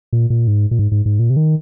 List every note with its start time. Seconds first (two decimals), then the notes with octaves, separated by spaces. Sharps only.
0.13 A#2
0.30 A#2
0.47 G#2
0.71 A#2
0.79 G#2
0.92 G#2
1.06 G#2
1.19 A#2
1.30 C3
1.36 D#3